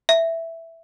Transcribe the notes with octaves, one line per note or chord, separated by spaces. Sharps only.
E5